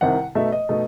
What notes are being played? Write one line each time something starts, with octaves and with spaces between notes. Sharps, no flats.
C2 C3 D#3 F#5
B2 A3 D#4 E5
D#5
B2 A3 D#4